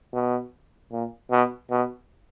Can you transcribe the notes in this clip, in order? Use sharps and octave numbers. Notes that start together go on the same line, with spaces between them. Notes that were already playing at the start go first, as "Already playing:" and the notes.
B2
A#2
B2
B2